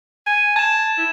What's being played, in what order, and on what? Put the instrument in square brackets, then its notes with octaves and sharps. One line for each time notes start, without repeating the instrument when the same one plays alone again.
[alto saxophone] G#5
[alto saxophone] A5 [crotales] G#6 E7
[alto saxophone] E4